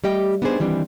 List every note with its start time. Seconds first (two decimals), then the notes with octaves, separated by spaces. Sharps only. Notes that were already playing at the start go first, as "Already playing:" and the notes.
0.04 G3 A3 G4 D#5 G5
0.42 B3 D4 D#4 G4 G#4 C5
0.60 D#3 E3 G3 C4 D4